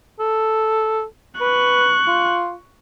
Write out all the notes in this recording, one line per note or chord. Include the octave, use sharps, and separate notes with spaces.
A4
B4 C#6 F#6
F4